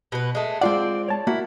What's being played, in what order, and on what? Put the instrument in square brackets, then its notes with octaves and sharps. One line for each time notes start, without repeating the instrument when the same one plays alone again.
[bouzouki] B2 B4
G#3 A3
[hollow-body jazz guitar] G#3 F4 F#5 [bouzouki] C4 D5
[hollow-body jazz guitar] C#5 A5
[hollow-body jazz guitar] A#3 F#4 [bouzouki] E4